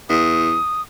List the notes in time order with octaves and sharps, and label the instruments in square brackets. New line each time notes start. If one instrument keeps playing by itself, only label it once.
[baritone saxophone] E2 [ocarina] D#6